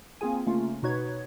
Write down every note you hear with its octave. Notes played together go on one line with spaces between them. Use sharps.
A#3 C4 F4 G#4 G#5
C#3 A3 A#3 C#4 F4
B2 D#4 F#4 B4 C#5 G#6